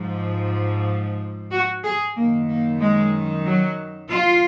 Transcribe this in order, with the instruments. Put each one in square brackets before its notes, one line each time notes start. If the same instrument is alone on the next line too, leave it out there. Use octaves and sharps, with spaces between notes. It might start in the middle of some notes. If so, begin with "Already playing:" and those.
Already playing: [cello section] G#2 F3
F#4
G#4
F#2 D#3 A#3
A#3
G#3
F#3
F4